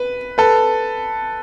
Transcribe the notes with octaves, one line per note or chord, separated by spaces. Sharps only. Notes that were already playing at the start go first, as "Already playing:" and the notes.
Already playing: B4
A4 B4